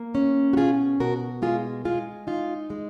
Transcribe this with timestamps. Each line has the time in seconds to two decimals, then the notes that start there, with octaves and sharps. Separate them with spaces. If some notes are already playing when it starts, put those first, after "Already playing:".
Already playing: A#3
0.15 C#4
0.53 F#4
0.57 B2 F4 G#4
1.00 B2 F#4 A#4
1.42 G#3 F4 G#4
1.85 G#3 F4 G#4
2.27 D#4 F4
2.70 G#3